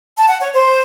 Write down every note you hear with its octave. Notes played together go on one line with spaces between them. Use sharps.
A5
F#5
C#5
C5